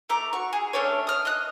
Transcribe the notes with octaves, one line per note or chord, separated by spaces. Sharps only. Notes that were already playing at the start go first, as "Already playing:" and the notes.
A3 A#5 D6
F#4 C#6
G#4
A3 C#4 D4 C#5
D#6 F6
D#5 D#6 F#6